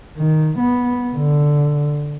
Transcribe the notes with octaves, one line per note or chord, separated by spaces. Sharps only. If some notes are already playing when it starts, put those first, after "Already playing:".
D#3
B3
D3